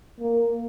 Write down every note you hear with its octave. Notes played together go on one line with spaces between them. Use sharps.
A#3